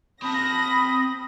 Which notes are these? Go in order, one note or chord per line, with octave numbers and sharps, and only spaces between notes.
C4 A5 B5 D#6 A#6